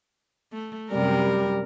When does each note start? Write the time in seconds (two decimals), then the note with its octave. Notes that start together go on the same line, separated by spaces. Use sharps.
0.53 A3
0.91 F#2 C3 G3 A#4